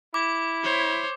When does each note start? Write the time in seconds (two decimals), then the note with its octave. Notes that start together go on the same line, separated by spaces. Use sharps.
0.14 E4 D6
0.64 C5 C#5